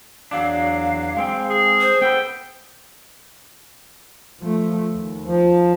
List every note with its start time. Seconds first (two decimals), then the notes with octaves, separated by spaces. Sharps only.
0.31 E2 F#3 D4 F5
1.17 G#3 C4 G5
1.50 G#4
1.81 C5
2.02 B3 A4 B4 G5
4.41 F3 A3
4.95 D#2
5.24 F3